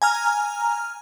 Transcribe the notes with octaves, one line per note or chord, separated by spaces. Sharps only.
G#5 A#5 F6